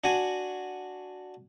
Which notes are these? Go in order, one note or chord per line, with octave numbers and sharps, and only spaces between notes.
D4 F#4 G#5